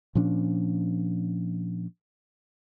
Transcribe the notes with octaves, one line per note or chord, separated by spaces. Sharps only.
A#2 F3 C#4 D4